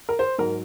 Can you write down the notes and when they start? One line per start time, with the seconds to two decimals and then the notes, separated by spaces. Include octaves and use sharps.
0.09 A#4
0.19 C5
0.38 G#2 F#3 A#4